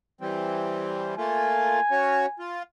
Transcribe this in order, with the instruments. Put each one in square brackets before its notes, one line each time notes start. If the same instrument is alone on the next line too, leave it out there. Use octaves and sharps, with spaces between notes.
[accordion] E3 G3 C4
[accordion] A3 A#3 F4 [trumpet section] G#5
[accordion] C#4 F#4 C#5
F4